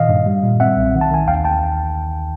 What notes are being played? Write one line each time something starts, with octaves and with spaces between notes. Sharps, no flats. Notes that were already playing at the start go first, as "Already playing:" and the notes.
Already playing: A#2 D#3 D#5 F5
G2
G3
A#2
C4 E5 F#5
B1
D#3
A5
D#3 G#5
D#2 F5 G5
D#2 G5 A5